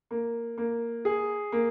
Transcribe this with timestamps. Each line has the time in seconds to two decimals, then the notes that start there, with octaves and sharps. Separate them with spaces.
0.11 A#3
0.58 A#3
1.05 G#4
1.52 A#3